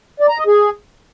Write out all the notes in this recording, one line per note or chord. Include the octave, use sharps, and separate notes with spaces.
D5
A#5
D#5
G#4